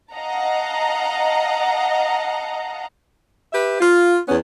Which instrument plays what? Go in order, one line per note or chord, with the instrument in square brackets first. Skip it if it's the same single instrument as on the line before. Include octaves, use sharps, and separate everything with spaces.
[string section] D#5 F5 F#5 A5 A#5
[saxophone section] G4 B4 E5
F4
E2 B3 C#4